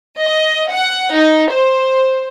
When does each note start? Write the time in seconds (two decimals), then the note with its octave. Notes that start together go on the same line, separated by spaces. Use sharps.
0.21 D#5
0.70 F#5
1.15 D#4
1.53 C5